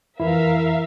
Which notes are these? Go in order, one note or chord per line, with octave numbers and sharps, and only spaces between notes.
F2 E3 E4 A#4 E5 F5